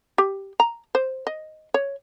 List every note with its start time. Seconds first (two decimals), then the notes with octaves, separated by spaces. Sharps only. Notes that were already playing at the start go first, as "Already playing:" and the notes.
0.18 G4
0.60 A#5
0.95 C5
1.27 D#5
1.74 C#5